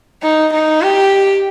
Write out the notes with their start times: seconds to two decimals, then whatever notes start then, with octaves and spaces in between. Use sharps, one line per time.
0.22 D#4
0.52 D#4
0.81 G4